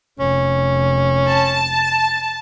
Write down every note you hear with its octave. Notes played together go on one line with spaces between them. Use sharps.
F1 C#4
A5